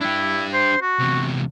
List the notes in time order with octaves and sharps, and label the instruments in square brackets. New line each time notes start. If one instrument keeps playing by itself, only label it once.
[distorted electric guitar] D4 G4 [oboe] E4
[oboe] C5
F#4
[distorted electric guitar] E2 C3